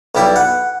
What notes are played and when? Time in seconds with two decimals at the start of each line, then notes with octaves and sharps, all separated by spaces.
0.15 B1 G3 E4 D5
0.36 F#5